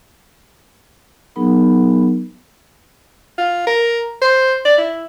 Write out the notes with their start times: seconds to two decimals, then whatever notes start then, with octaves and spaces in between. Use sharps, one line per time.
1.36 F#3 B3 D#4 G#4 A#4 B5
3.38 F4
3.67 A#4
4.22 C5
4.65 D5
4.78 E4